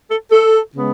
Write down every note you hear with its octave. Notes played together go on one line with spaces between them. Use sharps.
A4
A4
C#3 G#3 B3